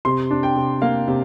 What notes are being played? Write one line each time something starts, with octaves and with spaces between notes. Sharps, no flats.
C3 C6
D4
G5
C3
A#3 F5
C3